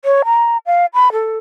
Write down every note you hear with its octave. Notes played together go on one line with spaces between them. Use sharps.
C#5
A#5
F5
B5
A4